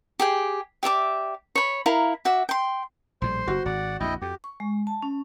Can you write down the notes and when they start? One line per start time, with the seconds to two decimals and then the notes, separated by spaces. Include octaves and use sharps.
0.19 G4 G#4 G5
0.83 G4 D5 E5 D6
1.55 C#5 B5
1.86 E4 A#4 F5 A#5
2.25 F#4 E5 D6
2.49 G5 C6
3.22 A#1 A2 G3 C5 C6
3.47 F#1 F#4
3.66 G#1 D5 F#5
4.00 A#1 F2 E4 D#5 G5
4.22 F2 G4
4.44 C#6
4.60 G#3
4.87 A5
5.02 C#4